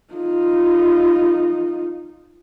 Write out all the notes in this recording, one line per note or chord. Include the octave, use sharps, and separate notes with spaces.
D#4 F4